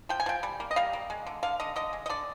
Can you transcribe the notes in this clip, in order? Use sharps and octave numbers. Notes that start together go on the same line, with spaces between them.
F3 G5
G#5
F3 G5
G3
A#3
D#5
G3 F5
A#3
G#3
D3
D3 F5
D3 D#5
D3 D#5
G#3
D#5
D3 D5